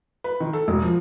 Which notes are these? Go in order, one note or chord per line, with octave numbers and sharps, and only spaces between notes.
B4
D#3
A4
E1
F3